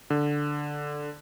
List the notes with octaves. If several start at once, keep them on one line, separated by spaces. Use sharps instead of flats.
D3